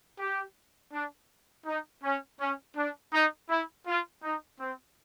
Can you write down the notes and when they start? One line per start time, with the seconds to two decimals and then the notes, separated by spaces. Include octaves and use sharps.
0.19 G4
0.93 D4
1.66 D#4
2.03 C#4
2.40 C#4
2.76 D4
3.13 D#4
3.49 E4
3.87 F4
4.23 D#4
4.60 C4